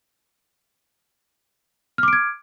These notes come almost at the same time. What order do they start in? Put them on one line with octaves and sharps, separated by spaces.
F6 D6 D7 G#6